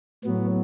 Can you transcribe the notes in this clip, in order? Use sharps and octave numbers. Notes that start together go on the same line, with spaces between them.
A2 F#3 B3